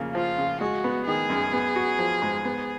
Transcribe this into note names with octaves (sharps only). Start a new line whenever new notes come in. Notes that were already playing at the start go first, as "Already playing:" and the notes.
Already playing: F2 C#3 A#3
F3 F4
C#3
G#3 F#4
B3
D#3 G#4
F#2
B3
F#4
F3
G#2
B3